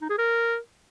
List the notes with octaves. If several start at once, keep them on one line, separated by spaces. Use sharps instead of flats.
D#4
G#4
A#4